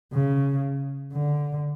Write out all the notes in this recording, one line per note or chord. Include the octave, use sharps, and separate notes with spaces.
C#3
D3